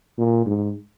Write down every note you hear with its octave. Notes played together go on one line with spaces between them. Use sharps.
A#2
G#2